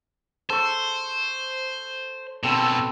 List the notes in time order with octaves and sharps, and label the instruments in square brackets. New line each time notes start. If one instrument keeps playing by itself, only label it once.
[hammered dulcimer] A4 C#6 [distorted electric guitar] C5
[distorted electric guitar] B2 D3 [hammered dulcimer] C4 A4 B5